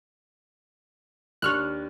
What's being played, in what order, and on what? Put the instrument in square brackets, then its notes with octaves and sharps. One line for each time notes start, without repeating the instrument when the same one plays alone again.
[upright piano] D#2 D4 [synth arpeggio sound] C#6 F6 F#6